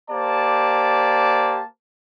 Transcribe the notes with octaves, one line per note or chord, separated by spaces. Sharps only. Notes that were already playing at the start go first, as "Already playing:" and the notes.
A#3 G4 C5 D5 A5